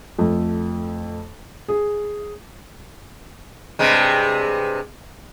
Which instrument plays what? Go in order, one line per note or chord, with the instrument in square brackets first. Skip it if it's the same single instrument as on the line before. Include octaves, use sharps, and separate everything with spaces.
[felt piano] F2 A3
G#4
[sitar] G2 C3 G#3